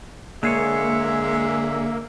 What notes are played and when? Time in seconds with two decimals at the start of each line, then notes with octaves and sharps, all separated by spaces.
0.43 D3 G#3 A#3 G#4 C#5 E5